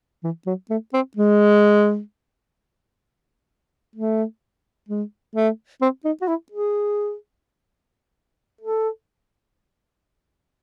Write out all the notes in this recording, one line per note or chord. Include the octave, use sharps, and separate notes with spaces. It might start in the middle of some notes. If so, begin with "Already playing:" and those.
E3
F#3
A3
C4
G#3
A3
G#3
A3
C4
D#4
F#4
E4
G#4
A4